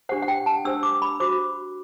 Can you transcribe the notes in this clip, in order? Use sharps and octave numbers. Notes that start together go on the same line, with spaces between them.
D4 G4 C5 F#5
F#5
G5
A5
D4 G4 C5 E6
D6
B5
F#4 C5 D6